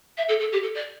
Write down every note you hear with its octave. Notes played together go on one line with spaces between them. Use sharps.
E5
A4
A4
G4
A4
D5